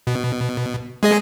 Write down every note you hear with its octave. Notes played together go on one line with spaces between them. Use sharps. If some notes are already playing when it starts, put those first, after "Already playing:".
B2
G#3 G#4 D#5